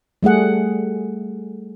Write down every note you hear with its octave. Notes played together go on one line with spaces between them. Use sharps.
G3 A3 G#4 F#5